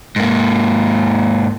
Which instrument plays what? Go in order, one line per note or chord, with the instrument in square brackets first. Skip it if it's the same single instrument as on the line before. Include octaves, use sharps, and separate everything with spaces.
[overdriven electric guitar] G#2 A#3